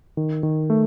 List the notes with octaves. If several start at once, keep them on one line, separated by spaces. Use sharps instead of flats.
D#3
D#3
A3